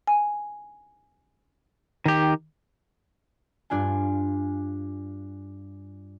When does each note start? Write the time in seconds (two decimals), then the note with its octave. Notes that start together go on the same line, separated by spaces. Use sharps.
0.07 G#5
2.06 D#3 G4
3.70 G2 D4 F4 G#5